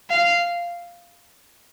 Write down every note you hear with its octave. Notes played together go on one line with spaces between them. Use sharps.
F5